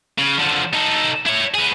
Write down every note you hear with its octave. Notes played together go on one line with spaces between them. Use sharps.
C#3
D3 F3
D#4 A4
E4 C#5
B3 G#4